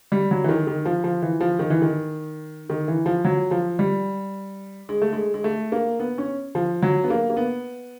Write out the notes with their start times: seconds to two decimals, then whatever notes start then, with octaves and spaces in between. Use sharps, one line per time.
0.12 G3
0.31 F#3
0.44 E3
0.49 D#3
0.67 D#3
0.85 F3
1.04 F3
1.22 E3
1.40 F3
1.59 D#3
1.70 E3
1.82 D#3
2.70 D#3
2.88 E3
3.06 F3
3.25 F#3
3.51 F3
3.79 G3
4.89 G#3
5.02 A3
5.13 G#3
5.34 G#3
5.44 A3
5.72 A#3
6.00 B3
6.18 C#4
6.55 F3
6.82 F#3
7.04 B3
7.10 A#3
7.30 A#3
7.37 B3